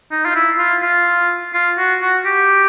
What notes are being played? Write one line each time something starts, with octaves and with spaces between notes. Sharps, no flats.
D#4
F4
E4
F4
F4
F4
F#4
F#4
G4